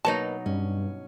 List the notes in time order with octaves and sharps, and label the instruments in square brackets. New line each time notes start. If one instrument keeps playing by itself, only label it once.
[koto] B2 F#3 D#4 [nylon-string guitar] A#3 A#4 B4 [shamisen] A5
[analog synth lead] G2 [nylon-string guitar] C#4